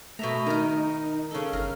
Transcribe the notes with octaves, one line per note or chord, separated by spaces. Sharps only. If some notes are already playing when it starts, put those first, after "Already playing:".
B2 A3 E5 A#5
D#3 D#4 A#4
C#3 A4
G1 A#4